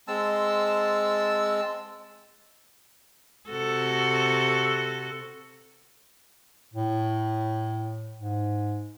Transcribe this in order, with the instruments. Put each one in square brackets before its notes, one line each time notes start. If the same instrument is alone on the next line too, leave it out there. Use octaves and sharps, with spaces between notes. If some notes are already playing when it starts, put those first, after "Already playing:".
[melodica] G#3 C4 A5 E6
[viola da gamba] C3 F#4 A4
[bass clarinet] A2
G#2